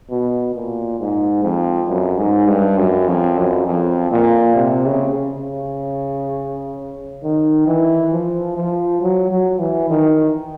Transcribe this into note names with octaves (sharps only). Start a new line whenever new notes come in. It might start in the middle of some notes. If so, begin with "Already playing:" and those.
B2
A#2
G#2
F2
F#2
G#2
G2
F#2
F2
F#2
F2
A#2
C3
C#3
C#3
D#3
E3
F3
F3
F#3
F#3
E3
D#3